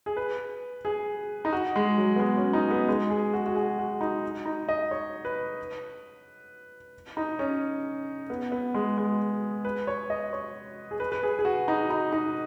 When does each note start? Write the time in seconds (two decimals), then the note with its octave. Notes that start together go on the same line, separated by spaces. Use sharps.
0.06 G#4
0.17 B4
0.85 G#4
1.45 D#4
1.53 F#4
1.76 G#3
1.98 F#3
2.16 B3
2.19 G#3
2.37 C#4
2.53 D#4
2.71 B3
2.88 G#3
3.10 G#4
3.33 F#4
3.46 F#4
3.56 G#4
3.79 F#4
4.01 D#4
4.46 D#4
4.69 D#5
4.91 C#5
5.25 B4
7.17 D#4
7.39 C#4
8.30 B3
8.52 B3
8.74 G#3
8.98 G#3
9.65 B4
9.87 C#5
10.10 D#5
10.33 C#5
10.91 G#4
11.00 B4
11.12 B4
11.23 G#4
11.39 G#4
11.45 F#4
11.68 D#4
11.90 D#4
12.13 D#4